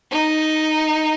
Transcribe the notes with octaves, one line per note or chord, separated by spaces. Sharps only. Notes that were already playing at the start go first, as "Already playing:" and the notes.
D#4